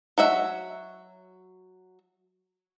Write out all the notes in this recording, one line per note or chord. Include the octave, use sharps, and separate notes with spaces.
F#3 F#4 E5